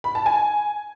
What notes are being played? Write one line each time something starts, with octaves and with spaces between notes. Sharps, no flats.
B5
A5
G#5